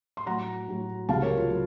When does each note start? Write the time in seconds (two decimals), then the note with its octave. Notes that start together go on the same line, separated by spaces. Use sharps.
0.17 C6
0.26 A2 F#3 F#5 A#5
0.68 A2 F#3
1.09 C#2 C3 F#3 F5 A5
1.22 A#4 C#5
1.37 F4
1.50 F#3